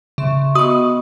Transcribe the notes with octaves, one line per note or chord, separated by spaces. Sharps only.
C#3 E5 C6 C#6
B3 F#4 D#5 C#6 D#6